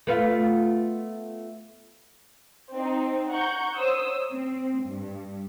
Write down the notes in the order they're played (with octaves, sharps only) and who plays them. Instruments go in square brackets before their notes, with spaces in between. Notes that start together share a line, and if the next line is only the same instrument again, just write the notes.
[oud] A3 B3 F4
[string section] C4 D#4
F#5 A#5 C#6 G6
C5 C#5 D#6 E6
C4
G2